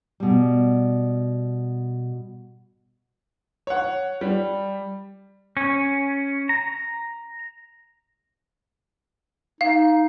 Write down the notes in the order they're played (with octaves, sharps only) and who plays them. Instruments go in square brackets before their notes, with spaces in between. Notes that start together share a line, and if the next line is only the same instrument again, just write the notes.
[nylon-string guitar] B2 G3
[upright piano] C#5 F#5
G3
[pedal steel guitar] C#4
A#5
[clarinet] D#4 [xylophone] F5